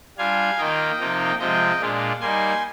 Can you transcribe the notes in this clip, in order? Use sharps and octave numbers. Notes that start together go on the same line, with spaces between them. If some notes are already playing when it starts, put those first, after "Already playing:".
G3 D4 F4 F5 G#5
D#3 A#3 F4 D#5 G5
C3 F3 A#3 D#4
C3 F3 G#3 D#5 G5
A#2 G#3 D4 F4
G3 A#3 D#4 G#5 C6